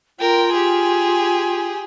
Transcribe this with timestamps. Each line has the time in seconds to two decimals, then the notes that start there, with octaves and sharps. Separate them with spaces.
0.19 F4 A#4 G5
0.53 G4 G#4